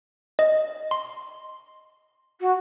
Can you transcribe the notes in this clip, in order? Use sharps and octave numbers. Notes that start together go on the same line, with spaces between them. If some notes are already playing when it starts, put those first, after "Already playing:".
D#5
C6
F#4